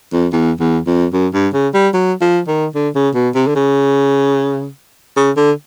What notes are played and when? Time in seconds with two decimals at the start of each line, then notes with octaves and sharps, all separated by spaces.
0.13 F2
0.33 E2
0.60 E2
0.87 F2
1.13 F#2
1.34 G2
1.54 C#3
1.74 G3
1.94 F#3
2.21 F3
2.48 D#3
2.75 D3
2.95 C#3
3.15 B2
3.35 C3
3.47 D3
3.55 C#3
5.17 C#3
5.37 D3